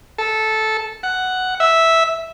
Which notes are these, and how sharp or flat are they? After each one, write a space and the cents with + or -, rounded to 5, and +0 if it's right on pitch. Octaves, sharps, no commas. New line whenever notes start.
A4 -10
F#5 +5
E5 -5